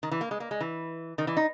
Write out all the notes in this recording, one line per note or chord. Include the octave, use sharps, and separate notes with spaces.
D#3
E3
A#3
G#3
A#3
G#3
E3
D#3
E3
D#4